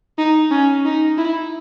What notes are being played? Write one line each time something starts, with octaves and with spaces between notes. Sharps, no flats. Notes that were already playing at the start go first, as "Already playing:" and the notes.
D#4
C#4
D#4
E4